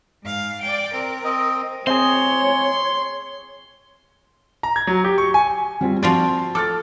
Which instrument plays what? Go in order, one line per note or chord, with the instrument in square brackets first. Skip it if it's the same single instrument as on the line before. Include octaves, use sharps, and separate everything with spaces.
[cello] G#2 F5
D5 G5
[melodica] C4 [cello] A#4
[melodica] C4 D#5
[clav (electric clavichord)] C4 [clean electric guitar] G#4 D#5 [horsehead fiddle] C#5 [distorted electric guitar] C6
[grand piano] A#5
G#6
F#3
G4
C#6
G#5
[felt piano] G3 C4 F4
[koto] F3 F4 D5 [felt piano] C4 F#4
[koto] A4 [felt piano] D6 F6 A6